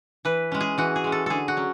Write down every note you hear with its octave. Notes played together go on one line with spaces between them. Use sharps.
E3 B4
G#3 C#4
G#4
E3 F#4
G#4
G#3 C#4
A4
D3 G#4 A4
F#4
F#3 C#4